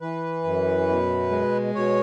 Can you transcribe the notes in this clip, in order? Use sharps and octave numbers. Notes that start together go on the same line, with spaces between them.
E3 B4
F#2
B2
G#3
B2 C#5